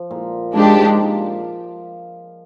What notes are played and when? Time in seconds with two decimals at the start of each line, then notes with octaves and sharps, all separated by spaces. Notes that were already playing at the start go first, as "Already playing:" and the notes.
Already playing: F3
0.11 A#2
0.53 G#2 G#3 D4 G4
0.97 A#2